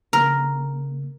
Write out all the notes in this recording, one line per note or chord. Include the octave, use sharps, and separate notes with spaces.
C#3 A#3 A#4